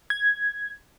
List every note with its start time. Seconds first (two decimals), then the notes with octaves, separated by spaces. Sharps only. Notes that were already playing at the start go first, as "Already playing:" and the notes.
0.10 G#6